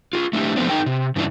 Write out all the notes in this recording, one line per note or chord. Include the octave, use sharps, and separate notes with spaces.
F4 G4 G#4
A3 D4 E4 G4
F3 A3 B3 C4 D4
D#4 G#4 A#4 G5
C3
G2 C#3 E3 A3 D4 E4